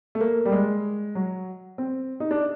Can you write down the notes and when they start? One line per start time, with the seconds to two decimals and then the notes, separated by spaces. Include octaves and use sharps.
0.15 A3
0.21 A#3
0.45 G3
0.52 G#3
1.15 F#3
1.78 C4
2.20 D#4
2.31 D4